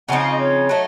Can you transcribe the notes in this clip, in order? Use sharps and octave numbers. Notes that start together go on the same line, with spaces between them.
C#3 F3 C4 D#4 F#5
F5
D#5
C#5
F#3 A3 D#4